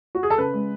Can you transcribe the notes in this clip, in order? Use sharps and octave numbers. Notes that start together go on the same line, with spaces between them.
F#4
G#4
A4
C#3 B4
G#3